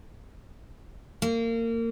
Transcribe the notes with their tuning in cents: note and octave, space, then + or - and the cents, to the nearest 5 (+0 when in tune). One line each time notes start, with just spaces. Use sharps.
A#3 -25